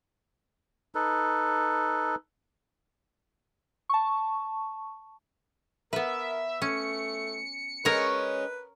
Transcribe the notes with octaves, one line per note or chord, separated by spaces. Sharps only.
D#4 A4 B4
A5 C#6
B3 A#4 B4 E5
A3 C#4 C#7
G#3 C#4 A#4 B4 C#5